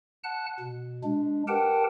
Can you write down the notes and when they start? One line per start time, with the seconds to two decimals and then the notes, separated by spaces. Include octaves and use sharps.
0.24 F#5 A5 F#6
0.60 B2
1.04 G#3 D4
1.48 G4 A#4 B4 F#5 G5 A5